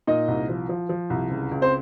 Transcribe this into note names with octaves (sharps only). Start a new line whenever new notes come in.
A#2 D#4 D#5
C2
F3
F3
F3
C2
C#2
C#2
C4 C5